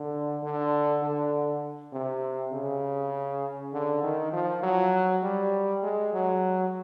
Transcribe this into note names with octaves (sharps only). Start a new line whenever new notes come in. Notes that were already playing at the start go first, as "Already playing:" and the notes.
Already playing: D3
D3
D3
C3
C#3
D3
D#3
F3
F#3
G3
G#3
F#3